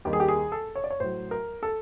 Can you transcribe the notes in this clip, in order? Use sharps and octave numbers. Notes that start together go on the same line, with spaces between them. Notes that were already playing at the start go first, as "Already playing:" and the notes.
D#2 D#3 G3 G4
G#4
G4
G#4
A4
C#5
D5
C#5
A2 F#3 C5
A#4
A4